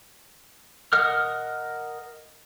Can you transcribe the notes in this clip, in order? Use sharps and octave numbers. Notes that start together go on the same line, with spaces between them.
A#4 D#5 F#5 F6